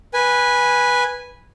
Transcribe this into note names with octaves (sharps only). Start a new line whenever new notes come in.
B4 G#5